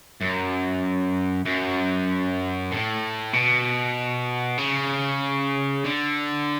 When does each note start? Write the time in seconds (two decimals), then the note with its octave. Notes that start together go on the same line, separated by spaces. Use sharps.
0.21 F#2
1.45 F#2
2.72 A2
3.33 B2
4.58 C#3
5.84 D3